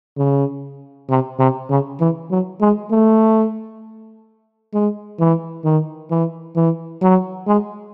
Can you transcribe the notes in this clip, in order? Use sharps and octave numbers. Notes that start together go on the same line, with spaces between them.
C#3
C3
C3
C#3
E3
F#3
G#3
A3
G#3
E3
D#3
E3
E3
F#3
G#3